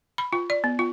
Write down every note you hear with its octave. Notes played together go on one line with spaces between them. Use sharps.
B5
F4
D5
B3
F4